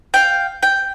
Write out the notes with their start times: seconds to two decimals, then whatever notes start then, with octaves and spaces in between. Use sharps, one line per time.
0.14 F5 G5
0.63 G5